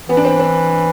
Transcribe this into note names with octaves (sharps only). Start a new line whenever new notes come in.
E3 B3
D4
C4
C4